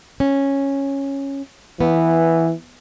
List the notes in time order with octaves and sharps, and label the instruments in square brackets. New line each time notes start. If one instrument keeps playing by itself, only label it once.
[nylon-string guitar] C#4
[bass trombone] E3 [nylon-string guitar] B3